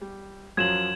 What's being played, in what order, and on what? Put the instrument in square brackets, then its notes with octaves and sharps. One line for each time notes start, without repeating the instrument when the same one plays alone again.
[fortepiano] G3
[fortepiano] F#2 F3 F#3 [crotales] G#6 E7 F#7